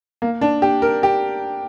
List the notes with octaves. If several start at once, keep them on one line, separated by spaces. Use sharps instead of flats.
A#3
D4
G4
A#4
G4